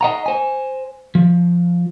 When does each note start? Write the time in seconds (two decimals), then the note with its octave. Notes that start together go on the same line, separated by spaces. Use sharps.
0.01 D#5 F#5 A#5
0.26 C5 G#5
1.15 F3